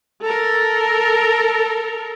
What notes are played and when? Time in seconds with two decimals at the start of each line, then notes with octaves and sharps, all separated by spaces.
0.21 A4 A#4